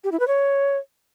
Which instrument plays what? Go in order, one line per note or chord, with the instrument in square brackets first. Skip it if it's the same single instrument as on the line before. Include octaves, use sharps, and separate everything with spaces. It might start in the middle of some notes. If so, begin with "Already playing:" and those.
[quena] G4
E4
B4
C#5